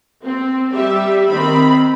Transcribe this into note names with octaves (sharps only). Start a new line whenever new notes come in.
C4
G3 G4 E5
D#3 C4 B5